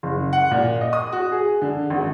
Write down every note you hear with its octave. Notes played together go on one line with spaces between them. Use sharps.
F#1
F#5
A#2
D#5
D#6
F#4
G#4
D3
G#1